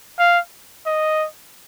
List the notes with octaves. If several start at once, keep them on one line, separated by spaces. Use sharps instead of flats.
F5
D#5